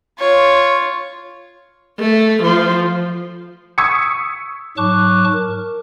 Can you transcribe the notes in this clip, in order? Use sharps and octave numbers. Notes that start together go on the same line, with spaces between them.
F4 C#5
A3
F3
C#6 D#6 E6 G#6 B6 C#7
G#2 F#3 A5 C#6 D6 F#6
A#4